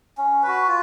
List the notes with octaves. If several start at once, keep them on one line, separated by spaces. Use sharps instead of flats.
C#4
F#4 B4
F4